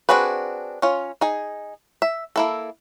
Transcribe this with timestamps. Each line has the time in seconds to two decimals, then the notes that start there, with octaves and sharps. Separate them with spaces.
0.09 C4 D4 F#4 G#4 B4
0.82 C#4 F4
1.21 D#4 G#4
2.02 E5
2.36 A#3 E4 A4